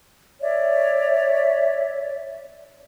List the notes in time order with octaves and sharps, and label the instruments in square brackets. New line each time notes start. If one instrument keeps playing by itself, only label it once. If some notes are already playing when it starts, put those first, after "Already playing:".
[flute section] C#5 D5 E5